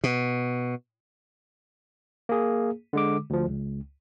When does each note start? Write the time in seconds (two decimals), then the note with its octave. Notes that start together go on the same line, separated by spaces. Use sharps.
0.04 B2
2.29 A#3 G#4
2.93 D3 G#3 D6
3.30 D2 F3
3.49 C#2